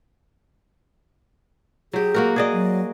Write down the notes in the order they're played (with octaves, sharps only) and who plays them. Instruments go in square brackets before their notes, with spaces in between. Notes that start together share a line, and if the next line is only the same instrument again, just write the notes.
[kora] F#3 G4 [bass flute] G#4
[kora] A#3 F#4 A#4
G#4 D5 D#5
[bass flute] F#3